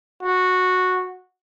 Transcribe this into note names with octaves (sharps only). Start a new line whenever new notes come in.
F#4